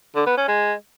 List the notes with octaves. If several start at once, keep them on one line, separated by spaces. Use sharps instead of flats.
D3
B3
C#4
G#3